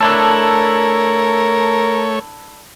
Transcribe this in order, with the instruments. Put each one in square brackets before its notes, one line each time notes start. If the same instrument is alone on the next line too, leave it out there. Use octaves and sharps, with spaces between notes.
[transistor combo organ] A3 C#5 [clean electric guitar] D4 E4 A4 [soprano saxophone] A#4